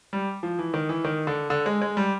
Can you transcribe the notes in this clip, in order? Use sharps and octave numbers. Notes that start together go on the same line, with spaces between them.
G3
F3
E3
D#3
E3
D#3
D3
D3
G#3
G#3
G3